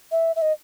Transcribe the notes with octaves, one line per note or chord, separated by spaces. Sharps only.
E5
E5
D#5